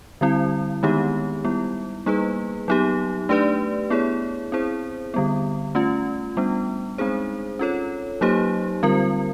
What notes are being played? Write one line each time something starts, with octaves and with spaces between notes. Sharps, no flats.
D3 G3 C4 E4
D#3 G#3 B3 D#4 G4
G3 B3 E4
G3 A#3 D#4 G#4 B4
F#3 B3 D#4 G4
A3 D4 G4 B4 D5
B3 E4 G#4 C#5
C4 E4 G#4 C5
D3 G3 B3
A3 C#4 F4
G3 B3 D4
G#3 C4 D#4 G#4 C5
C#4 F4 A4 C#5
F#3 A#3 D#4 G4 C5
D3 G3 C4 F4 A#4